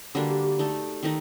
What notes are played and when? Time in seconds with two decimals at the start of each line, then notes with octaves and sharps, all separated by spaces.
0.15 D3 G3 A#3 D4 F#4
0.30 G4
0.44 G4
0.59 A3 D#4 A4 D5
1.03 D#3 A3 D#4